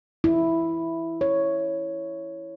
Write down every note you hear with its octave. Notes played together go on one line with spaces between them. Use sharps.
E4
C#5